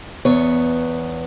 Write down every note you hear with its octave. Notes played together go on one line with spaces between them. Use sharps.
E2 B3 C#5